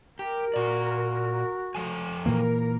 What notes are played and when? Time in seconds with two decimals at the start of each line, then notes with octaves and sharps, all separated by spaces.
0.19 G4 A#4
0.54 A#2 F#4 D5
1.75 F3 A4 G#5
2.26 A#2 E3 A#3 A#4